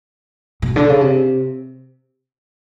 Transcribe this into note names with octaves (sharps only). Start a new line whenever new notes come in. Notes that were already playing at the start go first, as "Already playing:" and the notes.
B2
D3
C#3
C3